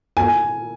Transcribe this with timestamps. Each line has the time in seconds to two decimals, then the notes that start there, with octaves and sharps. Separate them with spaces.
0.17 G#5